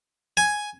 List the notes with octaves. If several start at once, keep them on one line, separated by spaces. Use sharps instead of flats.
G#5